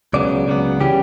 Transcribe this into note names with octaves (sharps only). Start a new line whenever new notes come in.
C#2 C#3 F#3 B3 D5
C#2 C#3 F#3 B3
C#3 E3 G3 C#4 G4